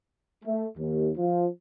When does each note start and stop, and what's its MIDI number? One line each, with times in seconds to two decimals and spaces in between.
0.45 0.66 57
0.78 1.10 39
1.17 1.45 53